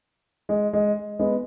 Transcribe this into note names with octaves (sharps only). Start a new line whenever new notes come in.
G#3
G#3
G#3 B3